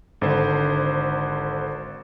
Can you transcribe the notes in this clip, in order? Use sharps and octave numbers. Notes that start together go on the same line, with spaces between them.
G#1 D3 C5